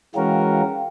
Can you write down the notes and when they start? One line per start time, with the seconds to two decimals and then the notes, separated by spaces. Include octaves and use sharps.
0.14 E3 G#3 C#4 F#4 A#4 F5 G5